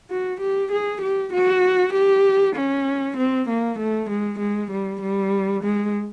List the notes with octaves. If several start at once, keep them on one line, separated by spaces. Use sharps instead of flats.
F#4
G4
G#4
G4
F#4
G4
C#4
C4
A#3
A3
G#3
G#3
G3
G3
G#3